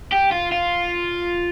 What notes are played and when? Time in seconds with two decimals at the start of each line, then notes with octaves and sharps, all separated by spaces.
0.12 G4
0.31 F4
0.52 F4